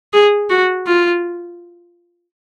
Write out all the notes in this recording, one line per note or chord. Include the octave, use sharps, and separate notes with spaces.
G#4
F#4
F4